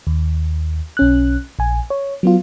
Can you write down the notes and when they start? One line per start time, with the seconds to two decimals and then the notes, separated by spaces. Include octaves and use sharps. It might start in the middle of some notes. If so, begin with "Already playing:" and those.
0.07 D#2
0.97 B1 C#4 F#6
1.59 A#1 G#5
1.90 C#5
2.23 F#3 B3 F4